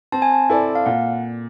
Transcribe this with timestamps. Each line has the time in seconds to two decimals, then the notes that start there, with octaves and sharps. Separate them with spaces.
0.12 C4 A5
0.22 G#5
0.32 A5
0.49 E4 A4 D5
0.75 F5
0.86 A#2 F#5